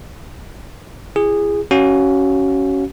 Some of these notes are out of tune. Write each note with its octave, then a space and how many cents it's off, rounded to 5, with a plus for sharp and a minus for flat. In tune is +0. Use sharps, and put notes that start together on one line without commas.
E4 +40 G#4 -15
C#4 +0 F#4 +30 F5 +15